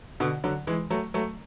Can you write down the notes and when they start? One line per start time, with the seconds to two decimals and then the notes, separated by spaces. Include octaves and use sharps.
0.20 B2 D3
0.44 D3 F#3
0.67 E3 G#3
0.90 F#3 A3
1.14 F#3 A3